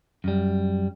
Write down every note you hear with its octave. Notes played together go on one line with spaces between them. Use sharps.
F#2 G3